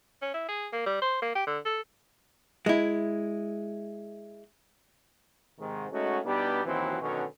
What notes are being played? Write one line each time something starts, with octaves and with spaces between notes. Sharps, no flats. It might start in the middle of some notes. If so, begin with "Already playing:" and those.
C#4
E4
G#4
A#3
G3
C5
A#3
G4
D3
A4
G#3 E4
G#2 C3 D#3
G#3 A3 C#4 D#4 F#4
B2 G3 B3 D4 D#4 G4
D#2 B2 E3 F#3 C4
B2 D3 D#3 F#3 C#4